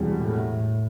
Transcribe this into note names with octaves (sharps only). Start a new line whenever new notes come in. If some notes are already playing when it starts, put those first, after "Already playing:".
Already playing: E1 E2 C3 G3
A2